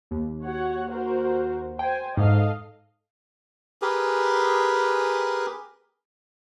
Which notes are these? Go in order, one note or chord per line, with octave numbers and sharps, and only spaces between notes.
D#2
F#4 C#5 F#5
F#4 A#4 C5
C5 G5 G#5
G#2 A4 D#5 F5
G4 G#4 A#4 B4